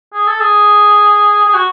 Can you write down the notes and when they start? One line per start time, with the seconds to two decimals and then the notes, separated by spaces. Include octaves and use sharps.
0.14 G#4
0.27 A4
0.40 G#4
1.45 G#4
1.54 F#4